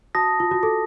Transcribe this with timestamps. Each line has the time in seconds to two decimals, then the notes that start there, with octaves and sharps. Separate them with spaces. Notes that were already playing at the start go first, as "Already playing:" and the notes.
0.15 F#4 A5 D#6 A#6
0.40 F4
0.51 F#4
0.63 A4